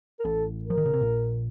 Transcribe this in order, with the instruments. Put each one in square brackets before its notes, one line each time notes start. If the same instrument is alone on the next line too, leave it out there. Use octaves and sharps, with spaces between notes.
[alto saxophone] A#4
[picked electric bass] A1 A2 [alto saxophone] A4
[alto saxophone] A#4
[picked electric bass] F3
D#3
C#3
C3
A#1 A#2